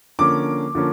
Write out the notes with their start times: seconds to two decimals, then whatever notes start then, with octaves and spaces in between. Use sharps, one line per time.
0.19 D3 F3 A#3 C#4 D6
0.75 D3 F3 A#3 C#4